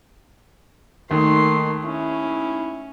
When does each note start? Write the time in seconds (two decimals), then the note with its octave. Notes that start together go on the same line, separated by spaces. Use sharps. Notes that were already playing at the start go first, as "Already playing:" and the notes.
1.11 D#2 D#3 A3 C6
1.85 C#4 E4